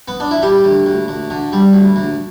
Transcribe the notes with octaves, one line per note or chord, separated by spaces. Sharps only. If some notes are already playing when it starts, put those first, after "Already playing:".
B3
D4
E4
G3 G4
D2
D2
D2
D3
G3
D2
D2